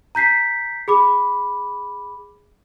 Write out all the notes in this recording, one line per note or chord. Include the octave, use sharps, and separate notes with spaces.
A#5 G6 B6 C7
G#4 B5 D6